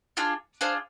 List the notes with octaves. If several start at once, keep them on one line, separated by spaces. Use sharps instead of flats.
D4 F4 G#4
D4 F4 G#4 C5